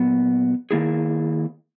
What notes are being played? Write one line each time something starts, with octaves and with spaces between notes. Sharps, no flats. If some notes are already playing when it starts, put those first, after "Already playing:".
Already playing: A#2 F#3 B3
D#3 F#3 A#3 E4 G#4